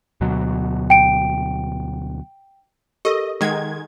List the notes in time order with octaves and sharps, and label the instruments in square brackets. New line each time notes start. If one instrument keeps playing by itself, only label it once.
[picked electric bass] D2 B2 F#3
[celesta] G5 D7
[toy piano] G4 A4 A#4 [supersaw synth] D#5
[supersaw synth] D#3 G#3 G#6 [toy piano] F#5 D6